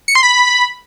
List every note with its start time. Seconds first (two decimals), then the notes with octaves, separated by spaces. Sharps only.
0.08 C#7
0.15 C6
0.23 B5